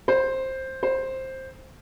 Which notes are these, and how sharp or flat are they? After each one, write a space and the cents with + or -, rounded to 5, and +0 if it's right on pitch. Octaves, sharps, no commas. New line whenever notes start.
C5 +10
C5 +10